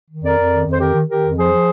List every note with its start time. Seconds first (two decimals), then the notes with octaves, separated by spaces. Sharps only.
0.09 D#3
0.23 F2 A#4 D5
0.38 F2
0.51 D#3
0.66 F2
0.73 C5
0.80 D#3 G4 A#4
0.94 D#3
1.08 D#3 G4 A#4
1.22 F2
1.37 F3 G#4 C5
1.51 F3